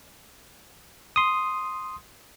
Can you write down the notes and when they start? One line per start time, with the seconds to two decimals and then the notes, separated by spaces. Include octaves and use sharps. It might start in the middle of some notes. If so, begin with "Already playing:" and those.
1.16 C6 D#6